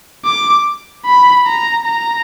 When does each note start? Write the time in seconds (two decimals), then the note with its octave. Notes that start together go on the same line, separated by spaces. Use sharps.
0.25 D6
1.06 B5
1.47 A#5
1.86 A#5